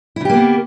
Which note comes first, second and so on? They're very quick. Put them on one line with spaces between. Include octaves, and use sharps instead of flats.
E4 C#3 G4 A#3 B3